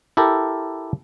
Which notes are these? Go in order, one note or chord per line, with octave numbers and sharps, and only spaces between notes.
E4 G4 A4 A#4